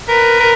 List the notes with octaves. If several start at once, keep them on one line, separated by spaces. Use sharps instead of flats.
A#4 B4
A#4